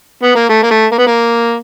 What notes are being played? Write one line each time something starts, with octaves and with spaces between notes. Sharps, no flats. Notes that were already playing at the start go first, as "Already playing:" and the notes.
B3
A#3
A3
A#3
A3
A#3
B3
A#3